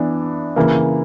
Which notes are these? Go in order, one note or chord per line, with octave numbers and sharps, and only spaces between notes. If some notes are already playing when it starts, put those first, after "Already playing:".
Already playing: E3 B3 D4
C#3 E3 A#3